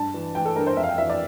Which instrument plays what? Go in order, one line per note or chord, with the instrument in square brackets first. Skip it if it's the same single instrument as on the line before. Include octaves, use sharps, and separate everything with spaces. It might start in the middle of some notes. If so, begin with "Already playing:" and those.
Already playing: [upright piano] G2 A5
E3
E3 G5
A4
G2 A#4
C5
F2 E5
F5
G5
E3 E5
D5